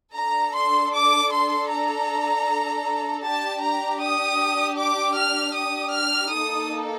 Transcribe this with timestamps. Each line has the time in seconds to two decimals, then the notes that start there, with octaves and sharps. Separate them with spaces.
0.16 D4 A4 A#5
0.55 C6
0.94 D6
1.32 C6
1.71 A#5
3.26 D4 G4 A5
3.65 A#5
4.04 D#6
4.80 D6
5.19 F6
5.58 D#6
5.96 F6
6.35 A#3 D#4 A4 D#6